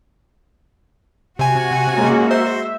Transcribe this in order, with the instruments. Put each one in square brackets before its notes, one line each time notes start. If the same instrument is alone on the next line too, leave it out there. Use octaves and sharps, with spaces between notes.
[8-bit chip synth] C3 G#5 [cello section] F#4
[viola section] G#3 A#3 C#4
[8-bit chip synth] C5 [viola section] E5